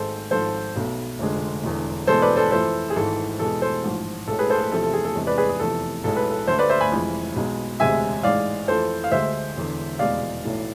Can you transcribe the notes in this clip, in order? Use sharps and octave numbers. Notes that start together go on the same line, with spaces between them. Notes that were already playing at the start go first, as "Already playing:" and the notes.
Already playing: G#1 G#2 G#3 A4 C5
G#1 G#2 F3 A4 C5
B1 B2 A3
F1 F2 D3 G#3
E1 E2 D3
E2 B2 G#3 A4 C5
B4 D5
A4 C5
F2 E3 A3 A4 C5
G#4
G#1 G#2 E3 G#3 A4
E2 B2 G#3 A4
A4 C5
A1 G#2 F3
B1 A2 G#3 A4
G#4 B4
A4 C5
A4
E2 C3 F3 A3 A4
A4
G#4
A4
E2 C3 G#3
B4 D5
G#4 B4
G#4
F1 E2 C3 F3 A4
B1 A2 G#3 A4
B4
A4
D2 D3 A3 A4 C5
B4 D5
C5 E5
G#5 B5
F1 F2 E3 G#3
B1 B2 G#3
E1 D2 C3 G#3 E5 G#5
A1 G#2 G#3 D5 F5
F2 E3 A3 A4 C5
F5
D2 D3 G#3 C5 E5
E1 E2 D3
F1 E2 B2 G#3 D5 F5
B1 A2 E3 A3